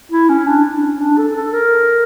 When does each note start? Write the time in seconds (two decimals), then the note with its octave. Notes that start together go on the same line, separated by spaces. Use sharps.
0.11 E4
0.29 C#4
0.47 D4
0.64 D4
0.83 C#4
1.00 D4
1.18 A4
1.35 A4
1.53 A#4